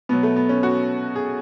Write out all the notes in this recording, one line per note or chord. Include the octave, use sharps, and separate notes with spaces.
B2 F#3 B3
A3
B3
C#4
F#4
G#4